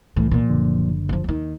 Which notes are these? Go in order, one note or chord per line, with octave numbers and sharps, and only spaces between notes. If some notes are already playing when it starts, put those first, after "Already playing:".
C2 A2 E3
A#2 F3
F#1 D3
E3 F3
D#2 D#3